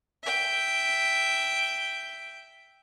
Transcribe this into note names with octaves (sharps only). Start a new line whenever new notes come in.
E5 G5